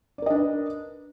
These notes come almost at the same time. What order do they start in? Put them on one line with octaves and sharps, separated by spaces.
D5 A#4 D#5 D4 B4